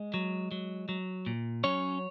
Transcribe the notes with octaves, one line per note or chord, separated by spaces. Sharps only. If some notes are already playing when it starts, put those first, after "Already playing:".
Already playing: G#3
F#3
F#3
F#3
A#2
F#3 C#4 C#5